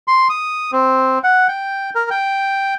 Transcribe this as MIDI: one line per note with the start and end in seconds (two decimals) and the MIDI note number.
0.08 0.28 84
0.29 0.71 87
0.72 1.19 60
1.24 1.47 78
1.49 1.90 79
1.95 2.10 70
2.10 2.74 79